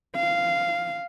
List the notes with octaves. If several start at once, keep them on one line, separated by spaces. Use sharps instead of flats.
F5